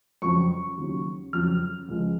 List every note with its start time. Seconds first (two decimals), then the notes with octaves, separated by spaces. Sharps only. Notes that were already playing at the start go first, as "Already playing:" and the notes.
0.22 F2 C#3 F#3 C#6
0.77 D#2 C#3 F#3
1.33 F2 C#3 F#3 F6
1.88 C#2 C#3 F3 G#3